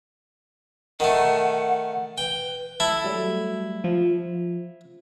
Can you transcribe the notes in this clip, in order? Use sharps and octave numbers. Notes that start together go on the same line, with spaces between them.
D#3 A3 F#5
B4 G5
E4 A4
F#3 G3 A3
F3